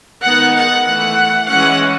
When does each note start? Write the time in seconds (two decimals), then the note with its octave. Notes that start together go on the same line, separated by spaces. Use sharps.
0.24 D#3 G#3 B3 D#4 F#5
0.55 F#5
0.86 E3 A3 E4 F#5
1.48 E3 G#3 C#4 E4 F#5